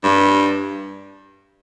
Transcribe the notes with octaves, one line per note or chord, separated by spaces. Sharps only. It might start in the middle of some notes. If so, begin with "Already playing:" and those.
G2